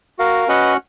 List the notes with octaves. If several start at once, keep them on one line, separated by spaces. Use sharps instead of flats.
F#4 A#4 F5
C#4 F#4 B4 D#5 F#5